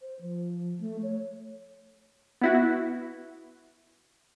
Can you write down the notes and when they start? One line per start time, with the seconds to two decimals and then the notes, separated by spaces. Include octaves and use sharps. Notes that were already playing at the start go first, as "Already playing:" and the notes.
0.02 C5
0.21 F3
0.80 A3
1.03 C#5
2.41 B3 E4 F#4